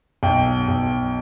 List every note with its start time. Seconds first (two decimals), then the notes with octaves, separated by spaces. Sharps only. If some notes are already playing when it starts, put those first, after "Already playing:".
0.23 B1 G5
0.68 B1